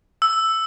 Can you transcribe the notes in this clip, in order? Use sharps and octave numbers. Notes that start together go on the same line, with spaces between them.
E6